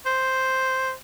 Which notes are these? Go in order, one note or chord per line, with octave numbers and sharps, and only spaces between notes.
C5